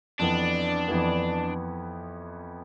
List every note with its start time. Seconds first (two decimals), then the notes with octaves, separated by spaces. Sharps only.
0.19 F2 E3 B3 D4
0.88 F2 E3 B3